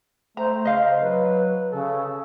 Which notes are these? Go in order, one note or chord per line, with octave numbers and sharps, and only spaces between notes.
A3 C5 A#5
C#3 D#5 F5
F#3 B4
C#3 A4